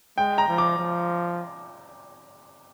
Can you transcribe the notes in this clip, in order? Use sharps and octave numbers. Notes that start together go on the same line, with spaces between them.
G#3 G5
A#5
F3
D6
F3